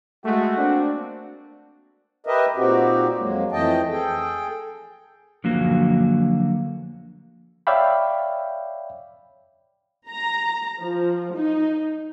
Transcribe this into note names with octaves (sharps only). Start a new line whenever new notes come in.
G#3 A3 F#4
A#3 C4 D4
G4 A#4 B4 D#5 E5
A#2 C4 D#4 F#4 G4
F2 F#3 G#3 A#3
F2 E3 A3 D#5 G5 A5
G#4 A4 G5
D3 F3 F#3 A#3 F#4
C#5 D5 E5 F5 G5 B5
A#5
F3
D#4